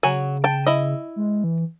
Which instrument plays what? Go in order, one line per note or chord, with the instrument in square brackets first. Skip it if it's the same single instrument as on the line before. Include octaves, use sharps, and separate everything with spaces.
[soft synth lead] C#3 [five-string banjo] F#3 F#4 G#5
[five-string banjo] G5 A5
E4 D#5
[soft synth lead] G#3
E3